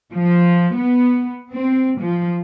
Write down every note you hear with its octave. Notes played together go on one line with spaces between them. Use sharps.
F3
B3
C4
F3